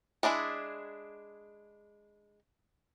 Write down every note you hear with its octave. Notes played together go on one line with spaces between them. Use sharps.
G#3 D4 E4 G#4